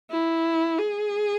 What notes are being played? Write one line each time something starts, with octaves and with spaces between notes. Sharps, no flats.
E4
G#4